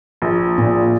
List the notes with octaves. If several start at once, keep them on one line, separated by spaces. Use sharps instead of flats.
A#1
A#2